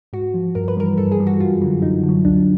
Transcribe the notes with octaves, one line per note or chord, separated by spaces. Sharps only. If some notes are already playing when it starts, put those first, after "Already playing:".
G#2 F#4
F3
G2 A#4
B4
E3 G3 A#4
G2 A4
G#4
E3 G3
F#4
F#2 F4
D3 F#3
F#2 D#4
D3
F#3
C#2 D4